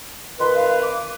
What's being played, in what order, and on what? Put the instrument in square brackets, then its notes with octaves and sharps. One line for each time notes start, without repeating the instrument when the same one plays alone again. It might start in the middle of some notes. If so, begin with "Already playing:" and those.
[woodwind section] F2 D#3 B4 [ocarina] C6
[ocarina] F5
D6